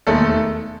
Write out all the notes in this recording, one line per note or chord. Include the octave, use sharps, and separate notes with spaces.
E1 D#2 D#3 G#3 A3 A4